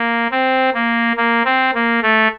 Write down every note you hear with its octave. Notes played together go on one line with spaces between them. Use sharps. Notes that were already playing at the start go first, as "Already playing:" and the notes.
Already playing: A#3
C4
A#3
A#3
C4
A#3
A3